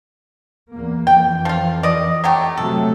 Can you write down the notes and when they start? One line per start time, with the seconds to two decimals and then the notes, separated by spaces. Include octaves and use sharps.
0.73 E2 A#3
1.07 F2 E3 G5
1.45 F3 F4
1.83 D5 D#5
2.24 F#3 A3 G4
2.57 C3 F#3 A3 A4